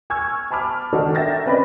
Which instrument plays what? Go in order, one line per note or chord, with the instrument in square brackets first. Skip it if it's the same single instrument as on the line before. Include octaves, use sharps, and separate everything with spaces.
[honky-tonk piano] G#5 C#6 E6 F6 G#6
G#5 A5 B5 D6 F6
D#3 D4 D#4 F#4 A4
A#4 E5 G5 A6 A#6
C4 C#4 B4 D5 D#5 B5